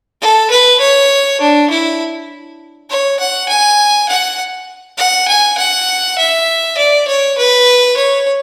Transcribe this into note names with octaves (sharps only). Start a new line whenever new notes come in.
A4
B4
C#5
D4
E4
C#5
F#5
G#5
F#5
F#5
G#5
F#5
E5
D5
C#5
B4
C#5